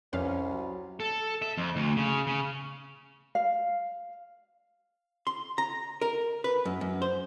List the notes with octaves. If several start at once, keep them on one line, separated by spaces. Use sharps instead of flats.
C2 F2 C#4 B4 F5
F#3
A4
E5
F2
D2
C#3
C#3
F5
C6
A#5
A#4
B4
F#2
F#2
C5